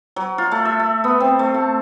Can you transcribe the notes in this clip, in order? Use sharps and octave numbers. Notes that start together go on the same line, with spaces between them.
F#3
F4
A3
E5
A3
B3
C4
A3
A5